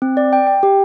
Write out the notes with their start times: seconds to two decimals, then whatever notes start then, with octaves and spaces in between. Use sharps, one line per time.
0.02 C4
0.17 D5
0.33 G5
0.47 G5
0.63 G4